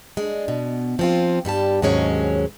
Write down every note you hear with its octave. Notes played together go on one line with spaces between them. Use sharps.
G#3 D4
B2
F3 C4 F4
G2 G3 G4 A5
D#2 G#2 F#3 G#3 C#4 C#5